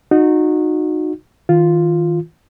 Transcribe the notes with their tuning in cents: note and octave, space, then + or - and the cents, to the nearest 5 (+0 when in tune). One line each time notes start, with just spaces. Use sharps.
D#4 -15 F#4 -25
D#3 +35 F4 +0